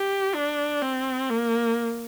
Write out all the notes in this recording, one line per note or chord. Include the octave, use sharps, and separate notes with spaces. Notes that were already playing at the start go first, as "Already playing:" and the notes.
Already playing: G4
D4
C4
A#3